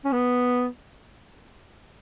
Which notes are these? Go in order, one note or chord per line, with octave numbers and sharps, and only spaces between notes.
C#4
B3